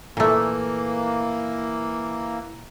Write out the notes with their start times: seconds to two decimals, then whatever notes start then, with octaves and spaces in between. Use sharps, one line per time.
0.17 A#2 E3 A3 A#3